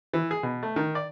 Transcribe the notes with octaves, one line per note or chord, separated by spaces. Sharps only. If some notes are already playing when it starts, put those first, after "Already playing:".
E3
G#4
B2
A3
D#3
D5